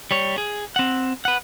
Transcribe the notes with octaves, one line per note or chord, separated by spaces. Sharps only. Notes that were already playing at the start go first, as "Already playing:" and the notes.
G3 C#5
G#4
C4 F#5
B4 F#5